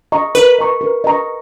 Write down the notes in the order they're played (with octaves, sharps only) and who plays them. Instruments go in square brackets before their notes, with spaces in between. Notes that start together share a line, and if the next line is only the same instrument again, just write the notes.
[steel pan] D#5 A#5 C#6
[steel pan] A#4 [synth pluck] B4
[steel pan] D#5 A#5 C#6
A#4
D#5 A#5 C#6